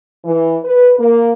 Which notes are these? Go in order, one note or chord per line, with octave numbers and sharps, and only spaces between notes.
E3
B4
A#3